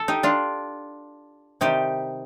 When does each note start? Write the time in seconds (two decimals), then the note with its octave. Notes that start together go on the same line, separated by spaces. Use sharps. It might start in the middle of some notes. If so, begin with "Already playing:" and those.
Already playing: A4
0.08 D#4 G4
0.23 D4 F4
1.61 C3 D#3 G3 D#4 G4